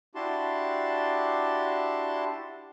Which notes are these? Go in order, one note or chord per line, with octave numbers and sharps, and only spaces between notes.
D4 E4 F#4 G4 A5 C6